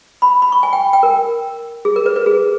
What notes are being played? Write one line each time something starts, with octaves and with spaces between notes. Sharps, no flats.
B5
B5
C#6
G#5
G5
G5
A#4
G#4
A#4
B4
B4
G#4